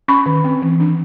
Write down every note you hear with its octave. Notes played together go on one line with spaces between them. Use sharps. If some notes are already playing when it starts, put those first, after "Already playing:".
C#4 B5 C#6
D#3
C4
E3
D4